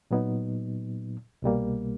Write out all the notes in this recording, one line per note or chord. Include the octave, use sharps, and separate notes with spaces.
A#2 F#3 B3 D#4
C2 B2 G3 A#3